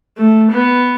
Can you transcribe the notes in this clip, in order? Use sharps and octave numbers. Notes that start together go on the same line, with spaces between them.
A3
B3